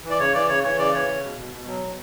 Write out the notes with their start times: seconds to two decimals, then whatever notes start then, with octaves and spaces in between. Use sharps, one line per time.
0.04 E3
0.10 D5
0.19 C#3 C#5
0.34 E3 D5
0.49 C#3 C#5
0.63 E3 C#5
0.78 C#3 D5
0.93 E3 C#5
1.08 C#3
1.23 B2
1.38 B2
1.53 B2
1.67 F#3
1.82 B2